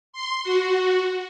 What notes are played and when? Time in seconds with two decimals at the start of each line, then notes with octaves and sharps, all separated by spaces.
0.13 C6
0.43 F#4